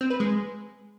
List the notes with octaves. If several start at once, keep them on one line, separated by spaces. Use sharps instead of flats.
C4
B4
G#3